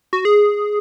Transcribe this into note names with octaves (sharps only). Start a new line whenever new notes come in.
F#4
G#4